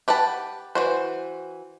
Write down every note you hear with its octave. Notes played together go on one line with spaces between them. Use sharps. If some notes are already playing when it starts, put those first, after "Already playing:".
G4 B4 F#5 A5
E3 F#4 C5